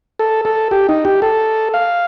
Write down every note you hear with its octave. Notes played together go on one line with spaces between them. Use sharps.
A4
A4
G4
D#4
G4
A4
F5